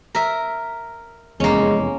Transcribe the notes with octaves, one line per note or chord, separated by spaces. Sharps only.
A#4 E5
F1 E2 G#3 A#3 C#4